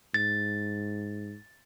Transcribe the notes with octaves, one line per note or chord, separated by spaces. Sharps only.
G#2 A6